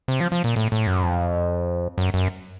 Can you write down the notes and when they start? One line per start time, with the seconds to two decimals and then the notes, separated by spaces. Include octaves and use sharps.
0.08 C3
0.20 F3
0.32 F3
0.44 A#2
0.56 A2
0.72 A2
0.87 F#2
1.03 F2
1.98 F#2
2.14 F#2